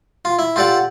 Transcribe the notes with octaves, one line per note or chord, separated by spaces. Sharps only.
F4
E4
F4 G4 A4 D5 F#5